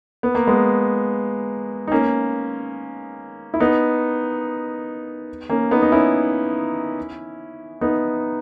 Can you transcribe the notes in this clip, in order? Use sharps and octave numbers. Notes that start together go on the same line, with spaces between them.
B3
A#3
G#3 B3
D#4
A#3 C#4
E4
B3 D#4
A#3 C#4
B3 D#4
D#4
C#4 E4
B3 D#4